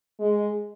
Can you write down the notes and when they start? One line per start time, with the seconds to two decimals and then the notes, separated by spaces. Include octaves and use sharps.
0.20 G#3